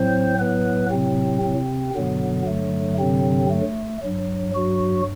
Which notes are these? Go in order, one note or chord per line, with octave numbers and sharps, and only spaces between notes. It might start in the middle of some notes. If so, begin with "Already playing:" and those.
Already playing: A2 F#3 C4 C5
B3 B4
C3 C4
C3 C4
G2 B2 D3 F#3 B3
A3
C3 C4
A3
G2 F#3
F#3 F#4